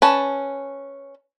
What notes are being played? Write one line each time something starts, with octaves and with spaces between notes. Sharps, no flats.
C#4 B4 A5